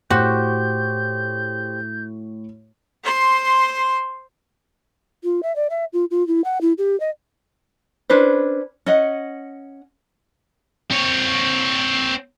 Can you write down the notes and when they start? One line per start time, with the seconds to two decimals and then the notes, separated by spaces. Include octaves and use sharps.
0.10 A2 F#4 G4 C5 C#6 G6
3.04 C5 C6
5.24 F4
5.43 E5
5.56 D5
5.70 E5
5.93 F4
6.11 F4
6.28 E4
6.45 F#5
6.61 E4
6.78 G4
7.00 D#5
8.10 C#4 D4 B4 C5
8.86 C#4 D#5 F#5
10.91 C4 C#5